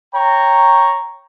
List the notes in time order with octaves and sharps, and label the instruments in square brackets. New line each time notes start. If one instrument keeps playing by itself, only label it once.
[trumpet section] C#5 G5 A#5 C#6